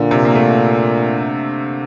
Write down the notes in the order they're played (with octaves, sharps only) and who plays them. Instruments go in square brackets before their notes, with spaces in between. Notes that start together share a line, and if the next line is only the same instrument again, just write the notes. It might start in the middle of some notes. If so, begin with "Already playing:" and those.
Already playing: [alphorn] A#2 [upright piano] D3
[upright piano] C3
A#3
A3